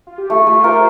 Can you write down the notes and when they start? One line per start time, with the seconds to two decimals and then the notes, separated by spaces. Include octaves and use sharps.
0.07 F4
0.18 G4
0.30 A3 A4
0.42 F4
0.47 A3
0.52 G4
0.64 A#4 C5